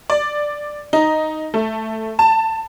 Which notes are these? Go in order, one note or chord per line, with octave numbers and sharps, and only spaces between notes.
D5
D#4
A3
A5